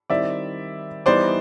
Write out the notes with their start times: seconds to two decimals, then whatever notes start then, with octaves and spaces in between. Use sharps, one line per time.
0.10 D#3 G3 C4 E4 D5 E5
1.06 E3 G3 B3 D#4 C5 D5